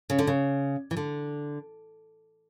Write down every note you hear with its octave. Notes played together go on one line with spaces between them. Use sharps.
C#3
D3
C#3
E3
D3